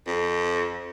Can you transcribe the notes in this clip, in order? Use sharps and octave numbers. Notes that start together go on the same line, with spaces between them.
F2